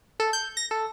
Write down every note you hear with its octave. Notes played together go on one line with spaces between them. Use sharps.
A4
G6
A#6
A4